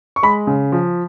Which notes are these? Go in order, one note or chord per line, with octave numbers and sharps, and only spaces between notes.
C#6
G#3 B5
C#3
F3